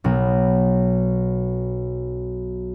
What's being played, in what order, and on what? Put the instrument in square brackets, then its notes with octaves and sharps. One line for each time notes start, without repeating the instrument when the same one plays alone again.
[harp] B1 B2